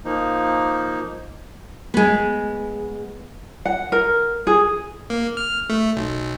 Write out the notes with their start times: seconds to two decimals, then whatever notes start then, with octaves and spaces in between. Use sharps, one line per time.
0.05 F3 A#3 D#4
1.94 G#3 B3
3.65 F#5
3.92 A#4
4.47 G#4
5.10 A#3
5.37 F6
5.70 A3
5.97 B1